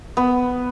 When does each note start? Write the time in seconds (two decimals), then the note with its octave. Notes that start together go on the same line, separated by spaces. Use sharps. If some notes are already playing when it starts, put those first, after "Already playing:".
0.17 B3